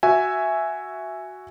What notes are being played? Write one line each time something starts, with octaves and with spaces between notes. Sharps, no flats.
F#4 E5 G#5